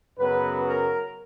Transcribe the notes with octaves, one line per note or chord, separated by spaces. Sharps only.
F#2 C#3 F#3 B3 B4
A#4